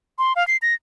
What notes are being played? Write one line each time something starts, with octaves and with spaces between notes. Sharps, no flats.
C6
F5
C7
A#6